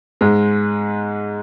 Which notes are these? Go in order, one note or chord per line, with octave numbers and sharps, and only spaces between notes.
G#2 G#3